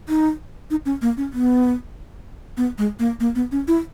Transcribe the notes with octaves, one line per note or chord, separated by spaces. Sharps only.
D#4
D#4
C#4
A#3
C#4
B3
B3
G#3
A#3
A#3
B3
C#4
E4